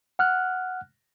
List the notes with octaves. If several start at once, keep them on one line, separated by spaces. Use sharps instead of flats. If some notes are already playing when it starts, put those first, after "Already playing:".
F#5 F6 F#6